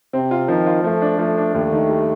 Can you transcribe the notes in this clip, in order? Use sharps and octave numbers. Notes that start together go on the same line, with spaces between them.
C3 C4
F4
D#3 F3
F4
F3 A3
D4
F3 A3
D4
D#2 A3
D#3
G3